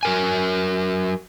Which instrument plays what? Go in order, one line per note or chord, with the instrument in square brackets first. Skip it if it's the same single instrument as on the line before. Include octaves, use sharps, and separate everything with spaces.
[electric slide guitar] F#3 A#4 G#5